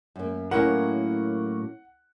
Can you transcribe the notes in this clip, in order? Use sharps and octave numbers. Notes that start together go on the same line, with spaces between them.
F#2 A#3
A2 F#3 A#3 C#4 E4 A#4 F#5